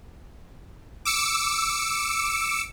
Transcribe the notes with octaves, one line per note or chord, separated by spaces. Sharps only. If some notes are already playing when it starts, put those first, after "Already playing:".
D6 E6 C#7